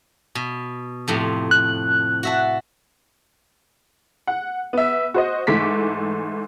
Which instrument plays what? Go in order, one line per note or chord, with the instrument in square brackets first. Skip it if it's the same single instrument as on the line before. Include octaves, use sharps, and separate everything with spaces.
[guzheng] B2
F2 A2 C3
[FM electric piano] F#6
[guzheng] F#4 E5 A5
[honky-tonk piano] F#5
B3 E5
F#4 C5 D#5
G#2 E3 A3 D6 B6